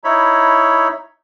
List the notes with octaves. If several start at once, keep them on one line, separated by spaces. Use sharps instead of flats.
D#4 E4 C#5 B5